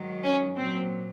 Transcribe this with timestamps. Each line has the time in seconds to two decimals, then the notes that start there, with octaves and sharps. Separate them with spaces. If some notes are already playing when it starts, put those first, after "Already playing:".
Already playing: G#2 D#3 F#3
0.24 C#4
0.57 A#2 F#3 C4